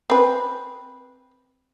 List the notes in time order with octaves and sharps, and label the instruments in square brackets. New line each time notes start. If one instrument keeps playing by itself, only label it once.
[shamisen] C4 B4